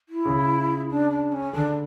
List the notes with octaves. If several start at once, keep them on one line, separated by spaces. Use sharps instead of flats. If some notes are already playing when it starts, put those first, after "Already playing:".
E4
C#3
D4
D4
C#4
D3 D4